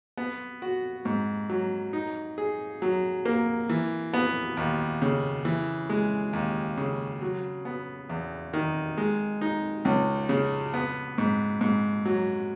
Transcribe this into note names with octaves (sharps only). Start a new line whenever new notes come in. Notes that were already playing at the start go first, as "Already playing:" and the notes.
B3
F#4
G#2
F#3
D#4
G#4
F#3
A#3
E3
B3
D#2
C#3
E3
G#3
D#2
C#3
F#3
B3
E2
D#3
G#3
D#4
C#2
C#3
B3
G#2
G#2
F#3